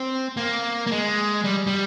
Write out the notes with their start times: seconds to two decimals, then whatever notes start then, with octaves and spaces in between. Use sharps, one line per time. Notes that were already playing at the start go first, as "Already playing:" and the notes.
Already playing: C4
0.37 A#3
0.87 A#3
0.91 G#3
1.44 G3
1.67 G3